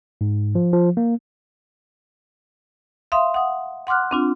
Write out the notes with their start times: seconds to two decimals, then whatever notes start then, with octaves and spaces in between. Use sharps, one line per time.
0.21 G#2
0.55 F3
0.73 F3
0.97 A#3
3.12 E5 F5 C6 D#6
3.34 F#5 D#6
3.87 F#5 C6 D6 F6 F#6
4.11 C4 D4 F4